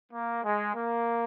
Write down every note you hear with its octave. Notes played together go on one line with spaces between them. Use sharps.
A#3
G#3
A#3